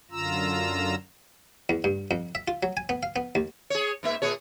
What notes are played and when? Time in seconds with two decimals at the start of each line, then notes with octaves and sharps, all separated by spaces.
0.11 F#2 D3 F4 A#5 E6
1.69 E2
1.84 G2
2.11 F2
2.35 E5
2.48 F4
2.63 F#3
2.77 G#5
2.89 B3
3.03 F5
3.16 B3
3.35 D#2
3.70 G#4 C#5
4.03 G#2 A#3 E5
4.22 A#2 G#4 C#5